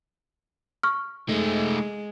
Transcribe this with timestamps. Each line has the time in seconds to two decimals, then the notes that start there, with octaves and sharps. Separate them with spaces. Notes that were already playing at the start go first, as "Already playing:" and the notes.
0.83 C#6 F6
1.29 G#3 A3 D#4